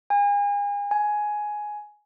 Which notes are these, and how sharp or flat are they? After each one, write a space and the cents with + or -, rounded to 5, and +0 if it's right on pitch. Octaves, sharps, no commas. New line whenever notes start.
G#5 -35
G#5 +10